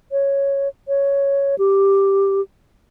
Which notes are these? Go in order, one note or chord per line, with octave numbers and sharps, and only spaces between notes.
C#5
C#5
G4